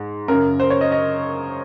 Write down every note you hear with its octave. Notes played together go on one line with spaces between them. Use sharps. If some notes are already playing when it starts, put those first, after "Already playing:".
Already playing: G#2
F#2 C#3 A#4
C5
C#5
D#5
D#5